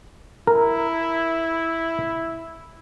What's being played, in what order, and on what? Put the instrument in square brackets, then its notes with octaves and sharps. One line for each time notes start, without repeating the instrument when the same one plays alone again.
[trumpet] E4 [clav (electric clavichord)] A#4